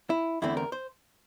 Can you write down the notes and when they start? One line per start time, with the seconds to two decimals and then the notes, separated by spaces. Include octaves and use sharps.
0.10 E4
0.42 E2 D3 A3 C4 E4
0.57 A#4
0.72 C5